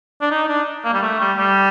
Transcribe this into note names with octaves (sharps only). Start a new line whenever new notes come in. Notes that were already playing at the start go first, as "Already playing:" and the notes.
D4
D#4
D4
A#3
G3
A3
G3
G3